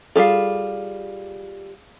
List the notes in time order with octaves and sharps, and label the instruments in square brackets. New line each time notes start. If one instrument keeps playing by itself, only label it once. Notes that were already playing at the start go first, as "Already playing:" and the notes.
[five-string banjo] G3 F4 A4 [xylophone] G#4 F5